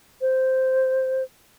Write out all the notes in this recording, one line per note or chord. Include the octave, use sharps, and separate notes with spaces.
C5